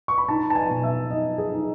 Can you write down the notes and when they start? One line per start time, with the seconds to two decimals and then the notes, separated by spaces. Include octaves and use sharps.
0.08 C#6
0.18 B5
0.28 D#4 A5
0.50 A5
0.56 G#5
0.69 B2
0.84 E5
1.11 D#4 D#5
1.38 G#4
1.52 D#4